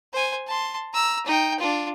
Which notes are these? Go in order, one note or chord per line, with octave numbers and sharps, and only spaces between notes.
C5 G#5
A5 C6
A#5 E6
D#4 G5
D4 F4